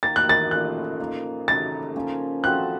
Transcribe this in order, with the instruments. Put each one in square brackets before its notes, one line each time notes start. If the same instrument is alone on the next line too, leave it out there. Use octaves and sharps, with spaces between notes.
[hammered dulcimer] D#3 A#3 D#4 A#4 [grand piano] A6
[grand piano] F#6
A6
[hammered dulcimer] A#2 A3 C#4 F4 [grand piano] F#6
[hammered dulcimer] F3 A#3 D#4
[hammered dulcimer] C#3 A3 D#4 A#4 [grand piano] A6
[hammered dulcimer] F3 A#3 C#4
[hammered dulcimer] F3 C4 F#4 A4 [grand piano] F#6